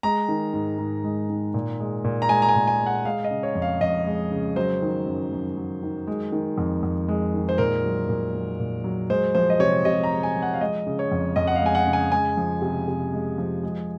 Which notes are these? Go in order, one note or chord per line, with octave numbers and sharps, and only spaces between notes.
G#3 A#5
D#3
G#2
G#2
G#3
D#3
A#2
G#3
A#2
A#5
G#3 G#5
A#5
G#5
A#2
G#5
G#3
F#5
G#3 F5
D#5
C#3
C#5
F2
F5
F2 D#5
G#3
C#3
F#3 C5
D#3
F#2
F#2
F#3
D#3
G#3
D#3
F2
F2
G#3
D#3
C5
A#2 A#4
F#3
A#2
F#3
A#2
F#3
G#3 C5
F3 C5
D#5
C3 C#5
C3 D#5
A#5
G#3
G#5
F3
F#5
F5
G#3 D#5
C#3
C#5
F2
F2 D#5
F#5
F5
G#3 G#5
F#5
C#3
G#5
G#3 G#5
F3
C3
C3
G#3
F3
G#3